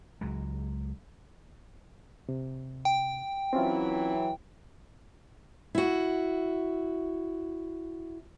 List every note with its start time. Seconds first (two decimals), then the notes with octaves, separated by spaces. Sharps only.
0.21 C#2 F#3 G#3
2.29 C3
2.85 G5
3.53 E3 F#3 C4 C#4 E4 F4
5.75 E4 F#4